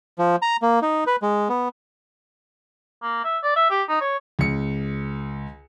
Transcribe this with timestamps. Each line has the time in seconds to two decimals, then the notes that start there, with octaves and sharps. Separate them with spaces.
0.19 F3
0.42 A#5
0.62 A#3
0.82 D#4
1.07 B4
1.22 G#3
1.49 B3
3.02 A#3
3.25 E5
3.44 D5
3.56 E5
3.70 G4
3.89 D#4
4.01 C#5
4.39 C#2 C#7